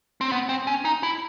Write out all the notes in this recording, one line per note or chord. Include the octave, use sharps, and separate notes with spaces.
C4
B3
C4
C#4
D#4
E4